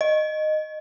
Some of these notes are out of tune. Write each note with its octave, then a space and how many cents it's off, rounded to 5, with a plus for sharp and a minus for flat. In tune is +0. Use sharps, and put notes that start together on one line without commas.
D#5 -10